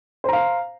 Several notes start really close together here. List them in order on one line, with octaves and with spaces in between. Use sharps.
C5 A#5 F5